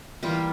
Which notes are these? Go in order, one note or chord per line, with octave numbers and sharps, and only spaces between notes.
E3 G3 A#3 F4 G4